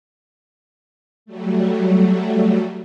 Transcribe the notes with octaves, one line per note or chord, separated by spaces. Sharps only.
F#3 G3 A3